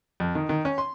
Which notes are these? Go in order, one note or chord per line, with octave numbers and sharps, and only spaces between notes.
F2
D#3
D#3
C#4
C6